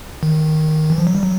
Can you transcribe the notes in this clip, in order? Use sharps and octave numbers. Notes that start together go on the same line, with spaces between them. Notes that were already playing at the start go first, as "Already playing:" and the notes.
D#3
E3
F3
F#3
G3
F#3